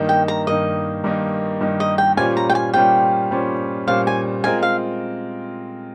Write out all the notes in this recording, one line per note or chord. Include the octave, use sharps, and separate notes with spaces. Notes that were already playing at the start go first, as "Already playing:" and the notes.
Already playing: G2 D#3 A#3 D#4
G5
A#5
G2 D#3 A#3 D#4 D#5
G2 D#3 A#3 D#4
G2 D#3 A#3 D#4
D#5
G5
A#2 G3 C#4 F4 C5 G#5
A#5
G5
G#5
A#2 G3 C#4 F4 C5 G5
A#2 G3 C#4 F4 C5
A#2 G3 C#4 F4 C5 F5
G#5
G#3 C4 F4 A#4 G#5
F5